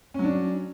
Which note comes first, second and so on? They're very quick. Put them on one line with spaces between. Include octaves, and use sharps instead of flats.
C#4 F#3 D4